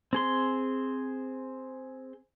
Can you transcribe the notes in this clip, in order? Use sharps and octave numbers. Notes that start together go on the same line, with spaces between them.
C4 G#4 C6